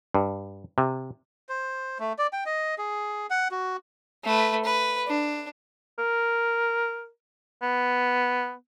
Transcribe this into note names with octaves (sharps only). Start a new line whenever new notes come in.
G2
C3
C5
A3
D5
G5
D#5
G#4
F#5
F#4
A3 B4
B4
D4
A#4
B3